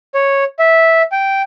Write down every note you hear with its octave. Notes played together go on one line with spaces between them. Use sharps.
C#5
E5
G5